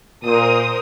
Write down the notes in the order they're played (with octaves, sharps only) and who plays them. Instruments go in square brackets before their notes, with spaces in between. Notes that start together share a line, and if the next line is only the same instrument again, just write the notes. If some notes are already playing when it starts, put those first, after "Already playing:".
[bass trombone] A#2 [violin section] A#4 C5 D#6